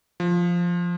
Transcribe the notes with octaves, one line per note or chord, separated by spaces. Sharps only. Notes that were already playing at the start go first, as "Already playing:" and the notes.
F3